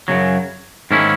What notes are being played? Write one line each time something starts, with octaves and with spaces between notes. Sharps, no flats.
F#2 C#3 F#3
G#2 D#3 A#3 C#4 E4